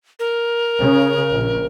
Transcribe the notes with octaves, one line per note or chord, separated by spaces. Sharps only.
A#4
C#3
A#1